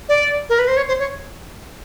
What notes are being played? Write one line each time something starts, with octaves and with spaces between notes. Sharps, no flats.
D5
A#4
B4
C5
C#5
C5
C#5